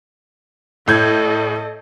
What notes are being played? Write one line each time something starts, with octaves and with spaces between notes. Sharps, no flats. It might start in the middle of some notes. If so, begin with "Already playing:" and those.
A2 A4 D#5 G6 G#6